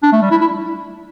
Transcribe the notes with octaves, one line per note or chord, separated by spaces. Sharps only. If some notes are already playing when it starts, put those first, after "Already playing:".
D4
A3
G3
E4
E4